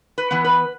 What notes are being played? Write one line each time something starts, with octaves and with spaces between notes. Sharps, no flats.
B4
E3 B3
B4